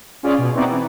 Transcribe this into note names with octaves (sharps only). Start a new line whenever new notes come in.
C#4 F4 G#4 D5
B2
B3 C4 D#4 E4 F#4 D5
E3